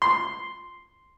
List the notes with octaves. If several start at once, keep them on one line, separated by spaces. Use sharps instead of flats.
C6